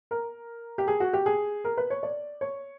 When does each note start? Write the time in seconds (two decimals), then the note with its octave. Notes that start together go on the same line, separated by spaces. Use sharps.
0.11 A#4
0.78 G4
0.88 G#4
1.00 F#4
1.13 G4
1.26 G#4
1.64 A#4
1.77 B4
1.90 C#5
2.03 D5
2.41 C#5